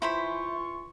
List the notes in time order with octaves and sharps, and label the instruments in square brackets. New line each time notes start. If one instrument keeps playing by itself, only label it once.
[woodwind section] E3 F4 C#6 [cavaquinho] E4 C5 B5